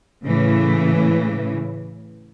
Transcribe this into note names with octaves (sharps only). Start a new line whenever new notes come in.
A2 C#3 E3